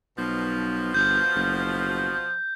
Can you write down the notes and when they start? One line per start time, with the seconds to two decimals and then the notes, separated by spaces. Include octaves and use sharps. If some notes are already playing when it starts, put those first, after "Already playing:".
0.18 B1 B2 F3
0.94 G1 G6
1.35 F#1